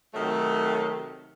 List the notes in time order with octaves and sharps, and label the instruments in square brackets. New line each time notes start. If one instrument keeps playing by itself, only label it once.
[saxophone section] C3 D#3 F#3 A3